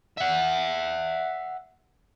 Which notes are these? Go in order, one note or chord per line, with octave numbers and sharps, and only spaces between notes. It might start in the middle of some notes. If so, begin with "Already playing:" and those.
E5 F#5